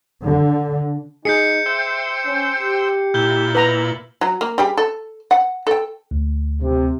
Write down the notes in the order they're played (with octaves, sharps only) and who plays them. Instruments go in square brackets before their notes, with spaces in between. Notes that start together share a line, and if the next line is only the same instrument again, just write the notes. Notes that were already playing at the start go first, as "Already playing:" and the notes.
[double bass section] D3
[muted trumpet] D#4 [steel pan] G#4 [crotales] G6 C7 C#7
[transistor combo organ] C5 G5 E6 [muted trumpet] E5
[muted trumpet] C#4
G4
[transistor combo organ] A#2 E4 [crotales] G6 G7
[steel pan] B4 A#5 [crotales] F#7
[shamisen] F#3
A#3
G3 G4 G#4
A4
F#5
A4 G5
[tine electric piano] D2
[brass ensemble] C3